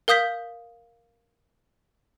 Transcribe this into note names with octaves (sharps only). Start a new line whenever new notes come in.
A#4 F5 D#6 G6 B6